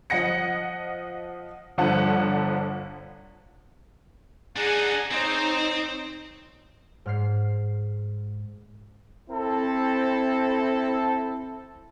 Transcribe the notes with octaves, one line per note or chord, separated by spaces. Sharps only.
F3 D#5 F#5 A#6 C#7
G1 D3 F3 F#5 A5
D4 D#4 G#4 F#5 G#5
C4 D#4 C5 C#5
G#2 F6 C7
C4 E4 A4